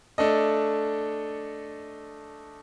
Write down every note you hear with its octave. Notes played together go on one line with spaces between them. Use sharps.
A3 D4 A4 D#5